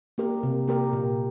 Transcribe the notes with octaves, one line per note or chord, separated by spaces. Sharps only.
A#3 G4 A#4
C3
A#3 G4 A#4
A#2